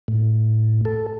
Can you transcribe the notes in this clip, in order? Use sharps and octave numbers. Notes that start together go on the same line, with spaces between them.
A2
A4